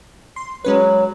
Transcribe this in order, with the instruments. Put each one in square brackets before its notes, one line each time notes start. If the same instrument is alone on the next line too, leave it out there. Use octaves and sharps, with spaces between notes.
[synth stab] C6
[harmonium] F#3 [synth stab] G#3 C#4 B4